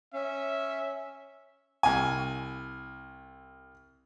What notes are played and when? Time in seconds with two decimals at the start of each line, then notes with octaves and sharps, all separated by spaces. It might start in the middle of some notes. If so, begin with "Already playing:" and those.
0.14 C#4 E5
1.83 C2 G#5